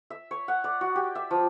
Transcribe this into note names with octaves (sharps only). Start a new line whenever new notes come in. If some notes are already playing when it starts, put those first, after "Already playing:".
E5
C#5
F#5
D5
F#4
G4
E5
F3